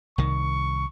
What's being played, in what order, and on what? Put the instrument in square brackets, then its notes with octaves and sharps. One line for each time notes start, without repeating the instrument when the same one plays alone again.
[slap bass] C2 D#3 [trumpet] C#6